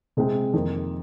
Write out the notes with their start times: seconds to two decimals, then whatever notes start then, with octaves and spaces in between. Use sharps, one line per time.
0.17 C3 G#3 C4
0.54 F2 D#3 A#3